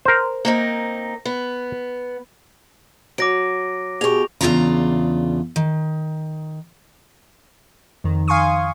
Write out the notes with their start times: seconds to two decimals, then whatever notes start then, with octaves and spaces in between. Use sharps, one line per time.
0.05 A#4 C5
0.45 A#3 C4 D#4
1.25 B3
3.18 F#3 D6 A#6 D7
4.01 B2 G4 G#4 C#6 F7
4.41 E2 G#2 C#3 D4 F4 A#5
5.56 D#3
8.04 F2 D#3
8.28 F5 G#5 C6 C#6 D#6